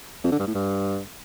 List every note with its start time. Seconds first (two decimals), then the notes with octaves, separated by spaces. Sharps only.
0.24 F2
0.32 D3
0.39 G2
0.47 A2
0.55 G2